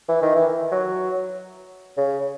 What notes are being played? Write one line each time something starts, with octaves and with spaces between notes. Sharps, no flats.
E3
D#3
E3
F#3
C#3